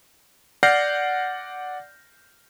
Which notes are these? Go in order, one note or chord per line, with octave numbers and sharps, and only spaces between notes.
D5 F#5 F6 G6 A#6 C7